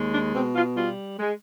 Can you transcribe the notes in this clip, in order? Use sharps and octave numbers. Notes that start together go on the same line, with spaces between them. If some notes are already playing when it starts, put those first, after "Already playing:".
Already playing: D#2 G#3
D4
B2 C4
F4
G3 F4
G#3